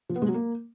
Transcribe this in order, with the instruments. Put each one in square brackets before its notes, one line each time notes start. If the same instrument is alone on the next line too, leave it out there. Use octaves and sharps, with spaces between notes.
[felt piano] F3
B3
G#3
F#3
A#3